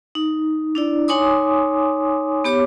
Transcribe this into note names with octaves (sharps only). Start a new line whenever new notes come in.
D#4
D4 E4 D5
D#4 C#5 G#5 C6 D6 D#6
B3 G4 C#5 D6